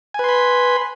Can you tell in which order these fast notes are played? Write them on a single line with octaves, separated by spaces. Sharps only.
G#5 B4 C6 B5